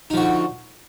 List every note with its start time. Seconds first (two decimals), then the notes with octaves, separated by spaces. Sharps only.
0.10 D#4
0.14 F3
0.17 F#4
0.20 D3